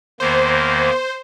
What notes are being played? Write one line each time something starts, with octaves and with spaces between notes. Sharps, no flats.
E2 D#3 A#3 C5